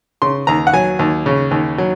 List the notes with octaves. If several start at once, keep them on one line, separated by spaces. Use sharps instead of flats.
C#3 C6
D#2 A#5
F#5
F#3 G#5
D#2
C#3
D#2
F#3